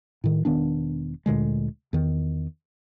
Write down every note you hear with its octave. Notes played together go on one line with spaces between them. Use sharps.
A2 D#3
E1 D#3 B3 D4
D2 A#2 D3 G#3
E2 D#3